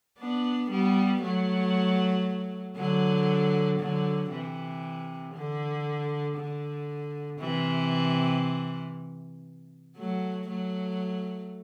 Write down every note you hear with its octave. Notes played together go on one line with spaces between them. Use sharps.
B3 D4
G3 B3
F#3 A3
D3 F#3
D3 F#3
C3 E3
D3
D3
C3 E3
F#3 A3
F#3 A3